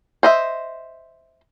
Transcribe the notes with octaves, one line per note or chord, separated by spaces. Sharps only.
C5 D#5 E5